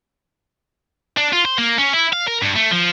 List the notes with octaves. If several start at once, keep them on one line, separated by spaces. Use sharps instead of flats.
D4
F4
C5
A#3
C#4
E4
F5
A#4
G2
A3
F3